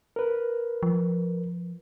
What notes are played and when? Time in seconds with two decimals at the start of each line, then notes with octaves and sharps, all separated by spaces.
0.16 A#4 B4
0.83 F3